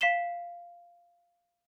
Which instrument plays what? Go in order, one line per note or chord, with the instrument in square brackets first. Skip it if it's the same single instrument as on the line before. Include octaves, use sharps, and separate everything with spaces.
[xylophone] F5 B6 C7 E7 G7